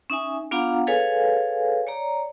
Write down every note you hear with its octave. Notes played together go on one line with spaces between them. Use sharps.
C#4 D#4 E5 G#5
B3 D4 F4 F5 F#5 A#5
G#4 A4 B4 C#5 F5 G#5
C#5 D5 A#5